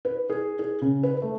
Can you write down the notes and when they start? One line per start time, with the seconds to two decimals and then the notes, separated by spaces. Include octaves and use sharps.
0.05 B4
0.30 G#4
0.59 G#4
0.81 C#3
1.03 B4
1.22 A3